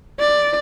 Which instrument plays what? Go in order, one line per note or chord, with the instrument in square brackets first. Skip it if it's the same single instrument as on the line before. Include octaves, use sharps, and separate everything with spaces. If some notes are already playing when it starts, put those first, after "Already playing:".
[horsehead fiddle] D5